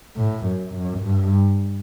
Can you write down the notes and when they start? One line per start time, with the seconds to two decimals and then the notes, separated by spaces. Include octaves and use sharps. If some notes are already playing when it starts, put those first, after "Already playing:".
0.16 A2
0.46 F#2
0.75 F#2
1.04 G2